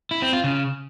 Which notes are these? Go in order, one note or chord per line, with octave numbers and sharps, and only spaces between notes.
E4
C4
F4
C#3